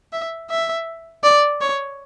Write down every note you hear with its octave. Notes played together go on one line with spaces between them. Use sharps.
E5
E5
D5
C#5